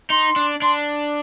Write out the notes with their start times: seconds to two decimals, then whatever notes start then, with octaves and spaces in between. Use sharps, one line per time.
0.10 D#4 C6
0.36 D4
0.62 D4 C6